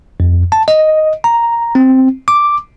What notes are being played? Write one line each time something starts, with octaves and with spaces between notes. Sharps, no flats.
F2
A5
D#5
A#5
C4
D6